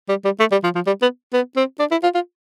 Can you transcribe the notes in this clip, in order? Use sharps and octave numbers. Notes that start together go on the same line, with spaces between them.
G3
G3
A3
G3
F3
F3
G3
B3
B3
C4
D4
E4
F4
F4